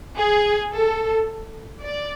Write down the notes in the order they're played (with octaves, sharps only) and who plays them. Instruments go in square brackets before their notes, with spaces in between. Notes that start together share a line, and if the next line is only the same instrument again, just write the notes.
[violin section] G#4
A4
D5